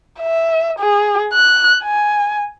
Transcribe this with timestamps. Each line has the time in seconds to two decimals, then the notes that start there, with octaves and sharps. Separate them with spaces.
0.21 E5
0.79 G#4
1.33 F#6
1.84 G#5